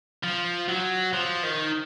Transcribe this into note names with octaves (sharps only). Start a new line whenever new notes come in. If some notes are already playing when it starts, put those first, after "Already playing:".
F3
F#3
F3
D#3